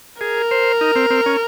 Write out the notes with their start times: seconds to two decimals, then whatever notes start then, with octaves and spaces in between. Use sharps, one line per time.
0.21 G#4 A#4
0.51 C5
0.81 D#4
0.96 C4
1.10 C4
1.26 C#4